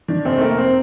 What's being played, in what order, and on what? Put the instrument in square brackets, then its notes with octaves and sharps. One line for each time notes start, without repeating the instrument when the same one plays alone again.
[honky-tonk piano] D#3 [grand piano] D4
[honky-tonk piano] F1 [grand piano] C4
[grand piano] A3
[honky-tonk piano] F1 [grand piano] A#3
[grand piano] C4